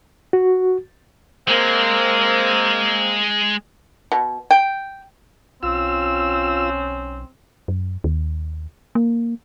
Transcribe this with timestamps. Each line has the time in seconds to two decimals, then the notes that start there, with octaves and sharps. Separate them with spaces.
0.33 F#4
1.48 G#3 A#3 C4
4.12 B2
4.51 G5
5.63 B1 C4 C#4 F4 E6
7.68 F#2
8.04 D#2
8.95 A#3